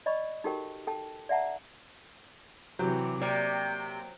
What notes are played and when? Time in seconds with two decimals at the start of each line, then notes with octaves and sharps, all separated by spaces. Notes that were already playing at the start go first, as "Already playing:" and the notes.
0.06 D5 D#5 B5 C#6
0.44 D#4 F#4 G4 A4 A#4 G5
0.87 A4 G5 A5
1.29 D5 E5 F#5 A5 A#5
2.79 C3 E3 F#3 G4
3.22 C3 A#3 D5 G5